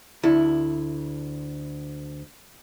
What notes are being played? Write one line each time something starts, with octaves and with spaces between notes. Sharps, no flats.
D2 E4